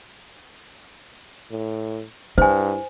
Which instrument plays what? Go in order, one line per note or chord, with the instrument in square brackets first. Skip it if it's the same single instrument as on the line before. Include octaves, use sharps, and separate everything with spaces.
[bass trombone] A2
[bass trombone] G2 [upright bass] E4 [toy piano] C5 G#5